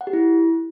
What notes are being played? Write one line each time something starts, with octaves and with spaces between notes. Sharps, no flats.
F#5
G4
E4